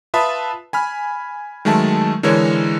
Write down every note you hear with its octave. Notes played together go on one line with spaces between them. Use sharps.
F4 B4 E5 A5 B5 D#6
G#5 B5 F6
D#3 F#3 G#3 A3 E5 A5
D3 E3 G#3 A#4 C#5